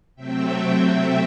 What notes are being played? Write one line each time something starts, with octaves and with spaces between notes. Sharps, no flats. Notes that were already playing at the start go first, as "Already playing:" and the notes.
C3 F#3 A3 C4 E5 G5